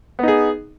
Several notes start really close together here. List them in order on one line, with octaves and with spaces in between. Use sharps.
B3 D#4 G#4